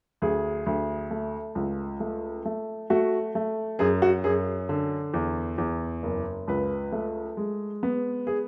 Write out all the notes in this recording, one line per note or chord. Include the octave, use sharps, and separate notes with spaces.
D2 G#4
D2
A3
C#2
A3
A3
A3 F#4
A3
F#2 G#4
F#4
F#2 G#4
D3
E2
E2
F#1
C#2 B4
A3
G#3
B3
G#4